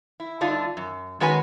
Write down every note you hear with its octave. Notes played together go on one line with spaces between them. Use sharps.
E4
G2 D3 D4 D#4 F4
F#2
D#3 G#3 C#4 F#4 B4 G#5